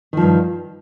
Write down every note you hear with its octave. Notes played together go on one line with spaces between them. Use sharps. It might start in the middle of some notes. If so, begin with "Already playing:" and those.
G2 D#3 F3